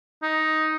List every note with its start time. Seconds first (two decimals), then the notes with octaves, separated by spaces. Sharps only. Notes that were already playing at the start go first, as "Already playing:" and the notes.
0.23 D#4